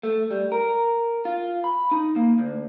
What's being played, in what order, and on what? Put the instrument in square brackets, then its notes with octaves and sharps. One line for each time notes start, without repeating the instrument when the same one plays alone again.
[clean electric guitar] A3
G3
A#4
F4
B5
D#4
A#3
D2